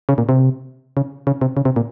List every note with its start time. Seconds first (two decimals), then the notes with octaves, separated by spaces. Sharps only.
0.09 C#3
0.18 A#2
0.29 C3
0.97 C#3
1.27 C#3
1.41 C3
1.57 C#3
1.65 C3
1.76 A#2